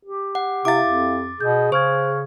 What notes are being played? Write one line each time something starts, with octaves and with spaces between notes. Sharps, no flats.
G4
F#5
C3 E4 E5 F5 D6 A6
F2
B2 G#4 G6
C#3 C5 C#6 F6 G#6